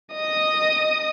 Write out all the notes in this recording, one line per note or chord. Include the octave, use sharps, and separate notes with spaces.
D#5 D#6